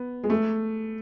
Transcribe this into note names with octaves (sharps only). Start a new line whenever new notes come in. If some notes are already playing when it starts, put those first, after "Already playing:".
Already playing: B3
G#3
A3